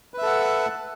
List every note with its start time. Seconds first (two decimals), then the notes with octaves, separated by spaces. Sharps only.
0.14 B4
0.18 E5
0.22 A4
0.27 F#5